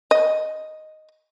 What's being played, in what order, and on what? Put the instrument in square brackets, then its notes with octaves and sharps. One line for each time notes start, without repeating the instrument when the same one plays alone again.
[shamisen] D#5